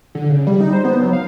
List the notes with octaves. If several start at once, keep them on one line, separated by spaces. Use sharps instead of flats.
D3
C#3
G3
D#4
C5
B3
F#3
F5